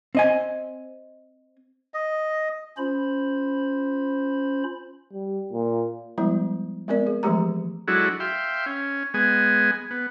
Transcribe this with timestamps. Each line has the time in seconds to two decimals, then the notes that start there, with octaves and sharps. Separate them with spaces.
0.15 C4 D#5 G#5
1.94 D#5
2.77 C#4 F4 C5 B5
5.13 G3
5.53 A#2
6.18 F3 G3 G#3 B3 E4
6.88 G#3 B3 C4 A#4 D5
7.07 G#4
7.23 E3 F3 G#3 A3 G4 A#5
7.88 F#3 G#3 D4 E4 F#4 A4
8.20 E5 F5 G5 C6
8.66 C#4
9.14 G#3 B3 G#5
9.91 B3